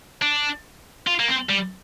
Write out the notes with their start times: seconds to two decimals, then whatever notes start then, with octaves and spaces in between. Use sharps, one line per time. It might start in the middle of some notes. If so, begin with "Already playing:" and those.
0.22 D4
1.07 F4
1.20 A#3
1.28 C4
1.50 G3